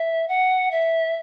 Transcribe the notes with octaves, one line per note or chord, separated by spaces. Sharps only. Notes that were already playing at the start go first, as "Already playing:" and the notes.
Already playing: E5
F#5
E5